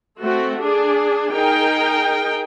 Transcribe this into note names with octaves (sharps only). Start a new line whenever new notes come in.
A3 C4 F#4
D4 G#4
D#4 G#4 A#4 G5